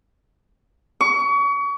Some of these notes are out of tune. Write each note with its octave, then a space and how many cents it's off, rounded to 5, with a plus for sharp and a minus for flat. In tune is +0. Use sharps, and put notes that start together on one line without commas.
C#6 +35